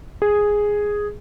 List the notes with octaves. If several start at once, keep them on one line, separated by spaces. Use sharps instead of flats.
G#4